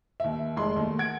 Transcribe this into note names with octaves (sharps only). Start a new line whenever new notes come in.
D#2 E5
F1 G#3 C6
D#2 A3
F#5 G#6 D7